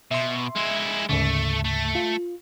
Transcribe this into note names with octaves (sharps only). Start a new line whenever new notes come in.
B2 E5 C6
G#3 E4
D2 G#2 C#3 A3
A3
F4